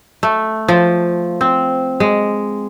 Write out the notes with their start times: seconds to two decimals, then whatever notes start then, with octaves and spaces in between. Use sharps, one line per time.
0.23 A3
0.68 F3
1.41 C4
2.00 G#3